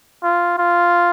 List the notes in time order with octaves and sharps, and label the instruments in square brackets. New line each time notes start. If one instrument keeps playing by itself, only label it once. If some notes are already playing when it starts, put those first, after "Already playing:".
[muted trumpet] F4
F4